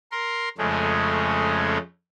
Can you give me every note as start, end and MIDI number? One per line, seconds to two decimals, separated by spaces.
0.12 0.49 70
0.12 0.49 84
0.58 1.78 41
0.58 1.78 49
0.58 1.78 56
0.58 1.78 57
0.58 1.78 61